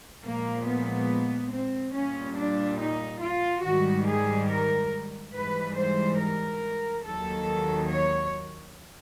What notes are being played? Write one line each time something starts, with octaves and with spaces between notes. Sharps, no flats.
A#2 F3 G#3 A#3
B3
C4
A#2 G3 C#4
D4
D#4
F4
G#2 D#3 G3 F#4
G#4
A#4
G#2 E3 G3 B4
C5
A#4
D#2 D#3 F#3 A4
C#5